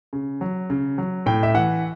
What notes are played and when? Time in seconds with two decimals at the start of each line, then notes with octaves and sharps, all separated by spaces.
0.13 C#3
0.41 F#3
0.70 C#3
0.98 F#3
1.26 A2 G5
1.43 E5
1.54 E3 F#5